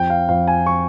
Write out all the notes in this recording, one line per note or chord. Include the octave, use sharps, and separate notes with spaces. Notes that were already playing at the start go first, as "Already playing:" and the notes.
Already playing: F2 G5
F5
F2 F5
G#5
C#6